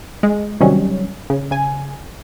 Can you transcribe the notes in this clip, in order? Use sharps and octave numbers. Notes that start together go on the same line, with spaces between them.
G#3
C3 D#3 F#3 G3 C#4
C#3
C#3 G#5